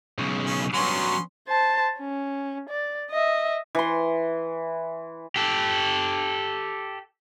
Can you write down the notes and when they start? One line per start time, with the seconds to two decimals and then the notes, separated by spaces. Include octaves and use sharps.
0.18 B1 C#3
0.46 C#4
0.74 G2 F#3 B3 C#4 C6
1.48 C5 A5
1.99 C#4
2.69 D5
3.11 D#5 E5
3.75 E3 C6
5.36 G4 A4